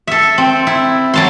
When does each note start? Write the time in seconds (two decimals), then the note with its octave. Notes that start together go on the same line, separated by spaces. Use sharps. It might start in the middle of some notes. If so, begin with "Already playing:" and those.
0.07 A4 E5
0.38 C4
0.67 E4
1.14 F#3 A5 C6